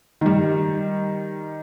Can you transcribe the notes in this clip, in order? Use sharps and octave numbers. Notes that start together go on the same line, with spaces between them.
D#3 G3